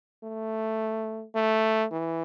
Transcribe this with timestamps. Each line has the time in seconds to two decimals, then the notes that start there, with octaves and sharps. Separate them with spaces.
0.23 A3
1.35 A3
1.91 E3